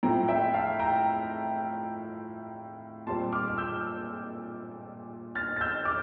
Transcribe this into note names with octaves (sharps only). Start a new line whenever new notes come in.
A2 F3 A3 C4 G5 A#5
E5 G5
F5 A5
G5 A#5
A#2 G3 C4 A5 C6
D6 F6
F6
E6 G6
F6 A6
A6
E6 G6
D6 F6